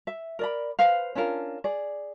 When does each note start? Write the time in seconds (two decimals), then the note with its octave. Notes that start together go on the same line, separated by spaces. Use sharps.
0.07 E5
0.39 A#4 D5 B5
0.79 B4 C5 F5
1.15 C#4 D4 F4 A#4
1.64 G#4 D5